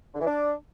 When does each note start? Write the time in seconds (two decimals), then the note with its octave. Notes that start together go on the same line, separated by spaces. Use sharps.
0.14 D3
0.21 E3
0.27 D4